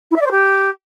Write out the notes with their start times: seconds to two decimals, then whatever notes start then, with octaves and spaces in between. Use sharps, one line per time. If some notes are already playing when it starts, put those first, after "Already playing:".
0.11 E4
0.16 E5
0.21 D5
0.26 C5
0.31 G4